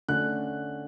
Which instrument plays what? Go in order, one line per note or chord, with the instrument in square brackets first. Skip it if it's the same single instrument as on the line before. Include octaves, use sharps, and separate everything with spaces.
[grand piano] D3 A3 C#4 F#6